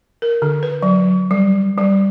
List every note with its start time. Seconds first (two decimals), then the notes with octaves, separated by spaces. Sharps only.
0.22 A#4
0.42 D3
0.63 B4
0.83 F#3
1.31 G3
1.78 G3